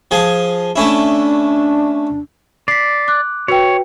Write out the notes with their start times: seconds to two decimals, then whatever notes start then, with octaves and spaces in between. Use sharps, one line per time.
0.11 F3 G#4 G#5
0.76 A3 C#4 D4 E4
2.68 D5 B6 C7
3.08 D6 F#6
3.48 F#4 B4 C#5 G5